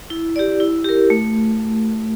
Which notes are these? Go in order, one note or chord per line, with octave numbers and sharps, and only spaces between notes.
E4
G4 D5
E4
G4 A#4
A3